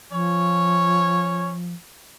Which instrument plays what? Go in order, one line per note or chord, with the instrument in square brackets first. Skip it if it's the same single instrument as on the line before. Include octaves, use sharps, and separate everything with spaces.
[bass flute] F3 [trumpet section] C#4 C#5